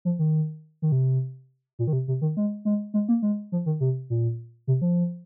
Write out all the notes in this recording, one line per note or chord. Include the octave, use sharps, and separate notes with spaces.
F3
D#3
D#3
C3
A#2
D#3
C3
C3
D#3
G#3
G#3
G#3
A#3
G#3
F3
D#3
C3
A#2
C3
F3